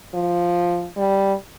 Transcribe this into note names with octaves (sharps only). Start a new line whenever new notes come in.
F3
G3